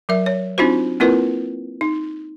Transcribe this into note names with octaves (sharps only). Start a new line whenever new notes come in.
F#3 A#4 E5
C#5
C4 D4 D#4 F4 F#4 C5
A#3 C4 E4 F4 A#4 B4
D#4